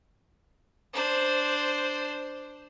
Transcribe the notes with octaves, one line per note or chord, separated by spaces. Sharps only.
D4 C5